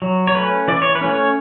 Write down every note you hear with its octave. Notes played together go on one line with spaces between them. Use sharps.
F#3
C#5
A3 C#4 B4
E3 D5
C#5
B4
A3 C#4
C#5